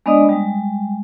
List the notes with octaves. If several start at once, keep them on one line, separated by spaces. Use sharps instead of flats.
G#3 B3 D4 D5 D#5 D#6
G3 G#3